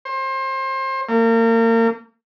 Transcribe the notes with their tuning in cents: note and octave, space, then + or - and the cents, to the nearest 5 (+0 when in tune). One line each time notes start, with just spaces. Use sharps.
C5 +30
A#3 -35